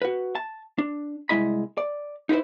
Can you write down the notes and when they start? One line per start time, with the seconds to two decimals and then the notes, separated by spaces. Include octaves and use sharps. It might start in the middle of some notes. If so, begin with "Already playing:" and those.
0.02 F#4 B4
0.35 A5
0.78 D4
1.29 C2 E3 G#3 E4 D#5 B5
1.78 D5
2.29 D#4 E4 G#4 B4 C5